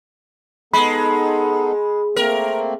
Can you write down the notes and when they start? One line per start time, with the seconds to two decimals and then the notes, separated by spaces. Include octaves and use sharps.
0.73 G#3 B3 D#4 A4 B5
2.16 A3 A#3 C4 A#4